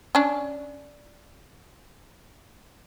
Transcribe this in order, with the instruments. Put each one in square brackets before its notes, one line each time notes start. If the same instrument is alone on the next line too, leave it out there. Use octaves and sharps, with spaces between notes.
[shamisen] C#4 D4